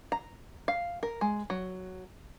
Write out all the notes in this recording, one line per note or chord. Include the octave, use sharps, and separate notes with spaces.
A#5
F5
A#4
G#3
F#3